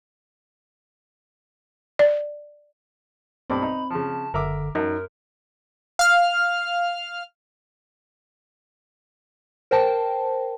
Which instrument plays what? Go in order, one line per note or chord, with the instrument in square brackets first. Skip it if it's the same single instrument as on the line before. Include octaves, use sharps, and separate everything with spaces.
[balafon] D5
[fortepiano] B1 G2 D6 [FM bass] C4 [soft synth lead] B5
[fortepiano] D#4
[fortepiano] C#3 F3 [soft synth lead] A5
[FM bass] F#1 [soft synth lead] D3 [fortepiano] A#4 E5 D6
[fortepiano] F#2 [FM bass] D#4 [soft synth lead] A#4
[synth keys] F5 F6
[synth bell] A#4 C5 G5 A5